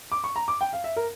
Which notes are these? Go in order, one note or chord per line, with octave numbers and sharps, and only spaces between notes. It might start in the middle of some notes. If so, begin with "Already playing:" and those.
D6
C#6
A#5
D6
G5
F5
E5
A#4